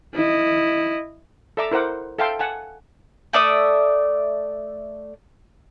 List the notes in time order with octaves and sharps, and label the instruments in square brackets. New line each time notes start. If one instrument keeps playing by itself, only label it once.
[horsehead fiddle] E4 D#5
[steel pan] A4 D5 E5 A#5 D6 E6
E4 A#4 C5 F#5 D6
A4 E5 F5 G5 A5 C6
F#5 G#5 A5
[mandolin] A3 D5 E5 D#6